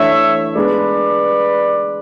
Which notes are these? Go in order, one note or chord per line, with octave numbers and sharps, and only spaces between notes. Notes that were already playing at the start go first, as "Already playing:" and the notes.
Already playing: E3 A3 D4 C#5 E5
G#3 B3 D4 B4 D5